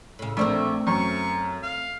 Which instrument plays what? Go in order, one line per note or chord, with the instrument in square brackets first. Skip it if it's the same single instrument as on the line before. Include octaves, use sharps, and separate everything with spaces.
[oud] A2 C#3
[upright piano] A#1 [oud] A3 C4 A#4 [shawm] E5
[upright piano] F#2 [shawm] C#6
[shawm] F5